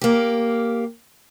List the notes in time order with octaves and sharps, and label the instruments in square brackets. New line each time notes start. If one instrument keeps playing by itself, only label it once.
[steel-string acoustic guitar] A#3 G4